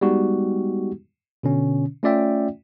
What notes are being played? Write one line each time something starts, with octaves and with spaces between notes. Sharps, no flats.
G3 G#3 B3 D#4 F#4 G4
B2 D3 C#4
A3 C#4 F4 D5 E5 G5